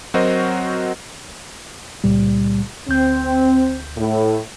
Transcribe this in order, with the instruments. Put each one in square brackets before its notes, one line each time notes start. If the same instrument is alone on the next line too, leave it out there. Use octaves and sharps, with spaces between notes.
[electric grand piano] F#3 C4 F#4 A#4 C5 D#5
[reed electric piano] C#2 A#2 G3
[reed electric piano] D2 G6 [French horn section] C4
[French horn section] A2